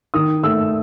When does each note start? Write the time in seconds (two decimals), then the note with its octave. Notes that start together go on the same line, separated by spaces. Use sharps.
0.14 D#3 D#6
0.44 A3 E6